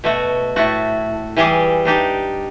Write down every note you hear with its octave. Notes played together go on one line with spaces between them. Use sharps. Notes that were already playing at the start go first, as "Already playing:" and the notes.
B2 A3 F#4
A2 A3 F#4
E3 G3 G4 G#4
D4 D#4 G4